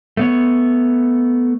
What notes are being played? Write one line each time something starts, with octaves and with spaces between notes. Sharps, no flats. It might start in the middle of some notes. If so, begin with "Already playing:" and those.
A3 B3 C#5